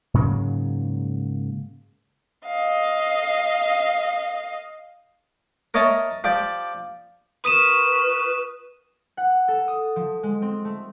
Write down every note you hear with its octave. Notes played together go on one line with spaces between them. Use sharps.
G#2 C#3 F#3 A#3
D#5 F5
A#4 C#5 D#5 E5 A5 A#5
F3 G4 D5
F4 A#4 B4 C#6 D#6 D#7 E7
F#5
A4
D#6
F3
G#3
C4
A3